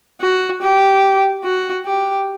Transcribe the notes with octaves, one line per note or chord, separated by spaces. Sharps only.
F#4
G4
F#4
G4